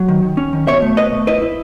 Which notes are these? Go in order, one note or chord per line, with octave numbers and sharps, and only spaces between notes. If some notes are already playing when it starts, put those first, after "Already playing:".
Already playing: F#3
D#3
D#3
C#4
D#3
B2 C#5 E5
A3
B2 B4 D#5
A3
E4 B4 D#5
E4